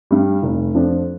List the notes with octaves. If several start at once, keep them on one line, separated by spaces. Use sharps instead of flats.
G2 G3
F1
F2 F3 D4